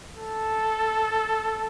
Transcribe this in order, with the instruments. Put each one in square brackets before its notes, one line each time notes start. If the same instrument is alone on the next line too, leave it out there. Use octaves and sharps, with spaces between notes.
[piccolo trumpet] A4